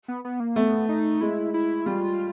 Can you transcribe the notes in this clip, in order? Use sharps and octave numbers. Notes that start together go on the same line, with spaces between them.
B3
B3
A#3
A3 B3
D#4
G#3 E4
E4
G3 F4